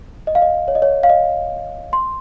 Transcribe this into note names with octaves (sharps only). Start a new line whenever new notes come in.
D#5
F5
D#5
C#5
D#5
C#5
F5
D#5
C6